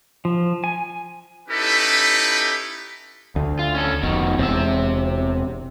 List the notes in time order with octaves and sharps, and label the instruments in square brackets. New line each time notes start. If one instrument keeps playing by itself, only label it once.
[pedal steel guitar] F3
G#5
[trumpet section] C#4 D#4 E4 G4 A4 B4
[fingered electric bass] D2
[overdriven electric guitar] F4
C#4 A4
[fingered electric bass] F1 [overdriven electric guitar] B2 D#3
[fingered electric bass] E1 [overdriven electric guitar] C3 E5